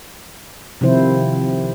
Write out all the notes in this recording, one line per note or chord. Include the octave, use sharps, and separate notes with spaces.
C3 D#3 F3 C4 E4 C5